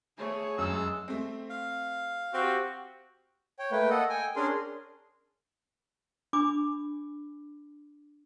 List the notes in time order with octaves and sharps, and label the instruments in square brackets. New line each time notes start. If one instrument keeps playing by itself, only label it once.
[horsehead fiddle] A3 G#4 [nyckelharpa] C#5
[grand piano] F#2 [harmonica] G#3 E6
[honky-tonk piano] A3 C4
[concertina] F5
[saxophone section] C4 G4 [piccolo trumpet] F#4
[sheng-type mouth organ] C#5 G5
A3 A#3 B4 G5
A4 D#5 F#5
G5 G#5
C#4 D4 G#4 A#4 C6
[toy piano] D4 G#5 B5 D6